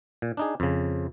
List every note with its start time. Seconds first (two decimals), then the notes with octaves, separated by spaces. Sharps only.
0.22 A#2
0.37 D4 D#4 G#4
0.60 F2 C#3